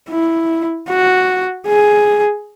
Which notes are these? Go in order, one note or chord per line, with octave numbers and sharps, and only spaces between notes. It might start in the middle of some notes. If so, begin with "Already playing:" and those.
E4
F#4
G#4